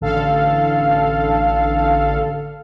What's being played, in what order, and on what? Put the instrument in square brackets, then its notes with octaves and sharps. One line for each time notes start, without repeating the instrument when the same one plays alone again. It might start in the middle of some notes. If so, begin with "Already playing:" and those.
[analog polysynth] A1 D3 A4 F5